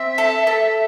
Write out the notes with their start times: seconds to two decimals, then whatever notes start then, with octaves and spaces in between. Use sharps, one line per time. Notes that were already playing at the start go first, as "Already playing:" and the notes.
Already playing: C4 E5
0.18 A4
0.47 A4